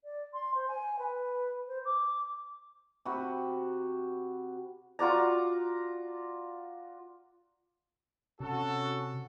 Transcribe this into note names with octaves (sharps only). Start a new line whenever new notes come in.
D5
C6
C5
G#5
B4
C5
D6
C3 F#4 B5
F4 F#4 D5 A#5
C3 C#4 F#4 A4